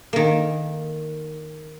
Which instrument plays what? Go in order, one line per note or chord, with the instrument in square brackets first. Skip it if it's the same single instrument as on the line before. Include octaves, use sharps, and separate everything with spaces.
[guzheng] D#3 A#3